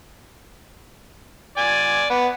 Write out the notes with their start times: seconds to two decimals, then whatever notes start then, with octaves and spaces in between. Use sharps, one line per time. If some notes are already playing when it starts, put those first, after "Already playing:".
1.57 D5 G#5
2.10 B3